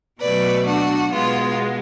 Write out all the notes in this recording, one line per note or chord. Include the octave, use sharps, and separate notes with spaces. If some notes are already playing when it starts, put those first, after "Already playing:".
B2 F#3 A3 B4 D5
D4 F#4
B2 G#3 B3 F4